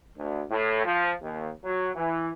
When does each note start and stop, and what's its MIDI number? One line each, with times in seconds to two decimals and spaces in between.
0.18 0.43 38
0.50 0.82 45
0.85 1.12 53
1.21 1.50 39
1.65 1.90 54
1.95 2.29 52